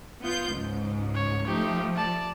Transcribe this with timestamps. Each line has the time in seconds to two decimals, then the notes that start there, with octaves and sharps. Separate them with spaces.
0.21 B3 F4 G6
0.53 C#2 G#2
1.15 C#5
1.47 F3 A3 D#4 G4
1.96 D5 A5